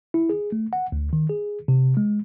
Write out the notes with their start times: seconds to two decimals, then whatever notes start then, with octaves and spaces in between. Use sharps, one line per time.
0.14 E4
0.29 G#4
0.52 A3
0.73 F#5
0.92 D2
1.13 D#3
1.30 G#4
1.68 C3
1.97 G#3